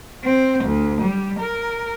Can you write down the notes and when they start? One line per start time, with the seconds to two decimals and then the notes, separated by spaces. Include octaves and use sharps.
0.24 C4
0.64 D2
1.01 G3
1.39 A#4